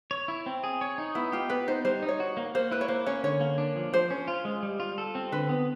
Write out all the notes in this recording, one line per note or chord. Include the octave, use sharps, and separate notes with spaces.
C#5
E4
C4
G#4
C#5
D#4
B3 E4
F4 G4
B3 B4
D#4 C5
G3 C5
D#4
C#5
F#4
A#3
A#3 C5
E4 B4
C#5
A#3 C5
C#4 C#5
D3 C#5
A#3
D4
F3
F3 C5
C#4
F4
G#3
G3
F4
A4
C4
D3 B4
B3